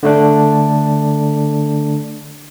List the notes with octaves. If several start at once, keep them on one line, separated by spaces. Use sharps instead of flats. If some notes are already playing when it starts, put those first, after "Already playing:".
D3 A3 D4